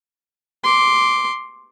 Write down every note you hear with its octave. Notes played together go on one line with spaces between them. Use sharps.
C6 D6